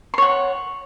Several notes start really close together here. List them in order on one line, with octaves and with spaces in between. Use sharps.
C6 C#5 F#5